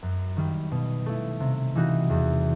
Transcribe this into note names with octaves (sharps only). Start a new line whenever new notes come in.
F#2
D#3 G3
B2
A3 E4
C3
E3 G3 D#4 F#4
E2